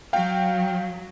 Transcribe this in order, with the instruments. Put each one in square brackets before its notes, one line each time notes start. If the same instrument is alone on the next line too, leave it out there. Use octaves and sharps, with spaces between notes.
[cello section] F#3 [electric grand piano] F5 G5